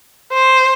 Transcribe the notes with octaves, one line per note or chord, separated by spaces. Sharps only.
C5